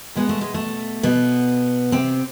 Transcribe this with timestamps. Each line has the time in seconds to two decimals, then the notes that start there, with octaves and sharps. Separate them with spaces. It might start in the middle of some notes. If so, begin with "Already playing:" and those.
0.16 B2 G#3 B3
0.29 A3
0.41 G#3
0.54 A3
1.03 B2 B3
1.92 C3 C4